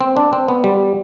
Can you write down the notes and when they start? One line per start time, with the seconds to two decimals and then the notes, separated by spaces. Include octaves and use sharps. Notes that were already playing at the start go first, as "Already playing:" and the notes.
0.01 C4
0.17 D4
0.33 C4
0.48 B3
0.64 G3